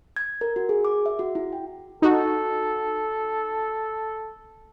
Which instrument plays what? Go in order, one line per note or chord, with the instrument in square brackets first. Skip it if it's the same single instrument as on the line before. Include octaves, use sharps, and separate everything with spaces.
[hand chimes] G#6
A#4
F#4
G#4
D6
E5
F#4
E4
G5
[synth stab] D#4 F#4 [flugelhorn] A4